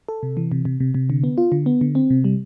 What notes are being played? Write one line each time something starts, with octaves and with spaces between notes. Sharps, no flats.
A4
C3
E3
C3
C3
C3
C3
D3
B3
F4
D3
B3
D3
C4
C3
G3